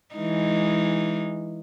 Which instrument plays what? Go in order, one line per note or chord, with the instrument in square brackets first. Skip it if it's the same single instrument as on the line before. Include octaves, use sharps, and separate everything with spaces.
[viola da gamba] E3 G#3 D#4